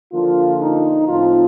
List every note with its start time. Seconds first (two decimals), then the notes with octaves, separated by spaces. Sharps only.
0.13 D3 F3 A#3 F4
0.61 D#4
1.08 A2 F3 C4 D#4 F4